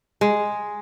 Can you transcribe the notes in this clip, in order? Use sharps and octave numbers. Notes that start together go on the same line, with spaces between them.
G#3